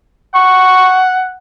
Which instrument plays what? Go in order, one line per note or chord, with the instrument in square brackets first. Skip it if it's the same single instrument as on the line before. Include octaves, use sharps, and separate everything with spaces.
[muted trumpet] F#5 [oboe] C#6